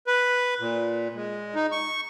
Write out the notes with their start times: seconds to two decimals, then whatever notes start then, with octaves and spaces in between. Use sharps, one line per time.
0.07 B4
0.60 A#2
1.15 G#3
1.55 D#4
1.72 C#6